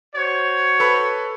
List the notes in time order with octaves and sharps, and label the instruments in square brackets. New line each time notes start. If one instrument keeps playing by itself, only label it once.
[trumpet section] F#4 C5 C#5
[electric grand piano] A4 B4 B5